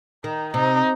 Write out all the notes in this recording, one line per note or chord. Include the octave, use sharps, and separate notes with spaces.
D#3 D#4
C3 D#4